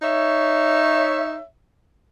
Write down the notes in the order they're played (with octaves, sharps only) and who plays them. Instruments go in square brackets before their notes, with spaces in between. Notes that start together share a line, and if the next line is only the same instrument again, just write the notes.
[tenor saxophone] D#4 [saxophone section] C#5 E5